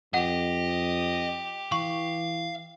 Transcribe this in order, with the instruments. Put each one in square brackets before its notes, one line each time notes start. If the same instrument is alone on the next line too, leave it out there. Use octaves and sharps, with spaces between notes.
[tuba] F2 [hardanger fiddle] G4 [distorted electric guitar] D#5 [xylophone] F#5
[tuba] E3 [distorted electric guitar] F5 [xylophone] C#6